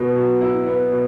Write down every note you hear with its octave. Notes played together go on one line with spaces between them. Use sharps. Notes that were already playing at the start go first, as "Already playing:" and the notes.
Already playing: B2 B3
F#3
E4
B3
B2